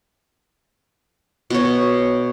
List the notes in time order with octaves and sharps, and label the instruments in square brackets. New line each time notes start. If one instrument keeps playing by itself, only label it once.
[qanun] B2 C#5